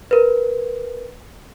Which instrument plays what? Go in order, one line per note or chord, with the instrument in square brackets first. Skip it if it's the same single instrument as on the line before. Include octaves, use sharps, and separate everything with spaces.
[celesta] A#4 B4